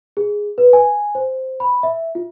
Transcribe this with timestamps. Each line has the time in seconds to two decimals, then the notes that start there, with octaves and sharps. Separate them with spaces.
0.17 G#4
0.58 B4
0.73 G#5
1.15 C5
1.60 B5
1.83 E5
2.15 F4